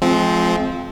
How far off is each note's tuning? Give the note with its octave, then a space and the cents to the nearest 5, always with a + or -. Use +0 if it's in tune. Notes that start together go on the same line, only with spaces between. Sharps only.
F3 +0 G#3 +40 C4 +0